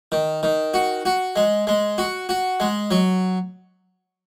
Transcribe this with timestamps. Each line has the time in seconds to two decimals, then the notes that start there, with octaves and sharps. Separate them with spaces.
0.12 D#3
0.43 D#3
0.74 F#4
1.05 F#4
1.36 G#3
1.67 G#3
1.98 F#4
2.29 F#4
2.60 G#3
2.91 F#3